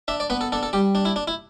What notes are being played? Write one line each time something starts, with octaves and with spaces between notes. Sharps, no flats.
D4 E5
D5
B3 B4
A4
D4 A4
A4
G3 G4
D4
E4
D4
E4